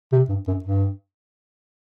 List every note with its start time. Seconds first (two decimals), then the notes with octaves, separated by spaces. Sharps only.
0.12 C3
0.29 G2
0.47 F#2
0.64 G2